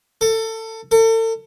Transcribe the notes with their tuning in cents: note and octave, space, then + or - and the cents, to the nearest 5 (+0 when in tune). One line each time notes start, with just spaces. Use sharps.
A4 +25
A4 +40